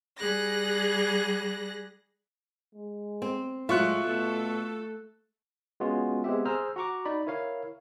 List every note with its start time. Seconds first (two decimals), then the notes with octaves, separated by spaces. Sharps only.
0.17 G3 G#4 F#6 A#6
2.74 G#3
3.22 C4
3.69 A2 F#3 G#3 F4 E5 C#6 F#6
4.05 B2 A3 A4
5.80 G#3 B3 C#4 F4 F#4
6.24 G#3 B3 C4 G4 E5
6.45 G#4 C5 A#5 E6 F6
6.76 F#4 F#5 A#5 C#6 D6
7.05 D#4 D5 B5
7.27 E4 A#4 C#5 F5